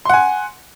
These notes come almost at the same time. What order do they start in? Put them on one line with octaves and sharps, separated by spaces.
C6 F#5 G#5